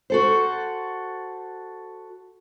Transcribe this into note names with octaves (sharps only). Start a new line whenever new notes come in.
F#4 A4 C5